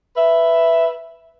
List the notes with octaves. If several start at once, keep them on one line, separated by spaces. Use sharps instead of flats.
B4 E5